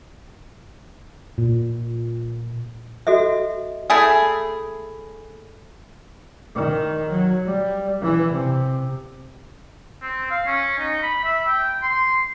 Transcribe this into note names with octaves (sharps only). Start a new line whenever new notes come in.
A#2
F#4 A4 D#5 E5
A3 E4 G#4
D#3
F#3
G3
E3
C3
C4
F5
C#4
D#4
B5
E5
G5
C6